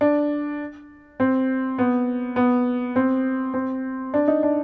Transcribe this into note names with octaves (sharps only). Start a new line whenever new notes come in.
D4
C4
B3
B3
C4
C4
D4
D#4
D4